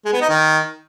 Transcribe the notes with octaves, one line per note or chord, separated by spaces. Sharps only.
G#3
B3
D#4
D#3